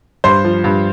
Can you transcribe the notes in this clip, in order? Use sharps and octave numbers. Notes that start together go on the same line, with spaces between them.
G2 C5 C6
F3
G2